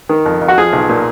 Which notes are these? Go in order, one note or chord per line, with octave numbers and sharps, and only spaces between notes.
D#3
F2
F2
F#4
F3 G#4
B1
A#2